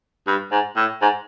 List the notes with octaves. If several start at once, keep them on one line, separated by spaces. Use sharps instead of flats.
G2
G#2
A2
G#2